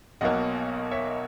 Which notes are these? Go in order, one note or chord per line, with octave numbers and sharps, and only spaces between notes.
B1 B2 F#3 A#3 D#5 F#5
C#5 E5